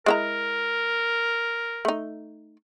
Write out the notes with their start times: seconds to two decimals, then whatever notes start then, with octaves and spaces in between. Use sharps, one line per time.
0.06 G#3 E4 A#4 A#5
1.85 A3 D#4